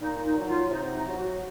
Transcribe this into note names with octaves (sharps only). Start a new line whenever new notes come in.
A#2 D#4
D#4
F#3
F4
C3 D#4
D#4
F#3
F#4